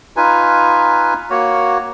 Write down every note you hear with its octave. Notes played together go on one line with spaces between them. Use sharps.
D#4 F4 B4 G#5
A#3 F#4 C#5